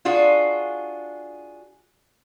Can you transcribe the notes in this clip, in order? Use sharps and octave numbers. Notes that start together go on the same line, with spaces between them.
D4 F4 F#4 G#4